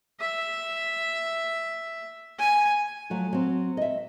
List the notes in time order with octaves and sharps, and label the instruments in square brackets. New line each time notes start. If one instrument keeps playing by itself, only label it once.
[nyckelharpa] E5
G#5
[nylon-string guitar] F3 F#3 A3 F#4
F#3 C4
D#5 E5